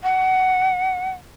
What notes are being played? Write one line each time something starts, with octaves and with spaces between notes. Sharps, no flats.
F#5